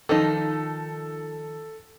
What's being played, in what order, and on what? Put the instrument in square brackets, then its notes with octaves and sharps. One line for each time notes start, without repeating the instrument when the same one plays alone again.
[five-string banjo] D#3 F3 D#4 [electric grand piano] A4